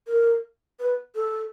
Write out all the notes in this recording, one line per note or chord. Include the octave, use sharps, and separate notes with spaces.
A#4
B4
A4